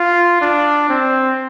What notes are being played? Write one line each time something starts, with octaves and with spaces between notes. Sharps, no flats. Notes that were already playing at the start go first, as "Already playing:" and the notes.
Already playing: F4
D4
C4